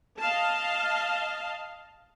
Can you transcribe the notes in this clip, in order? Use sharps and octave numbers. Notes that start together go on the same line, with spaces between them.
D#5 F5 A5